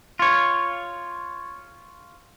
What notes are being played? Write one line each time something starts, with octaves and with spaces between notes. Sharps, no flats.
F4 C#5